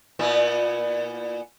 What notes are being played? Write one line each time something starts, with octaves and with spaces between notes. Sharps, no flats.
A#2 B3 E4